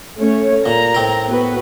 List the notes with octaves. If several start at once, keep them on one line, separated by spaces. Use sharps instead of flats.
A3 C#4 C#5
A#2 A#5
A2 C4 A#4
B3 F#4 B4